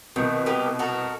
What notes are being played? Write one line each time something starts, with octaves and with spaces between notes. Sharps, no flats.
C2 B2 D#3
B3 G4 A#4
F#4 A4 A#4